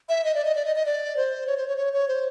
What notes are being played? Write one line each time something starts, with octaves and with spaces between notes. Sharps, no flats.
E5
D#5
D5
D#5
D5
D#5
D#5
D5
C5
C#5
C5
C#5
C#5
C#5
C5